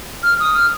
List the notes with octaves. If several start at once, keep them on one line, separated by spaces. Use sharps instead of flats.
F6
D#6
F6